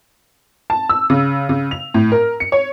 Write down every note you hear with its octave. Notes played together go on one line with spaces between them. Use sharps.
A5
E6
C#3
C#3
F7
A2
A#4
C#7
C#5